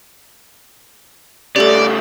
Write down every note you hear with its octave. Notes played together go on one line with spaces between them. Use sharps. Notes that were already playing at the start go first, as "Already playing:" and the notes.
C#3 A3 G4 A4 D5